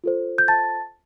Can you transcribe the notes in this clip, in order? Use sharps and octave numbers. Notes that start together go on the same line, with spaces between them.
F4 A4 C5
G6
A5 A6